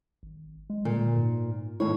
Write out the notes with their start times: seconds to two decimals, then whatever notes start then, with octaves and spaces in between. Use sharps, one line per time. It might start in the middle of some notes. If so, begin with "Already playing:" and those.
0.23 G#1
0.70 G#3
0.85 A#2 D3
1.17 G#2
1.80 D#2 A2 E4 C#5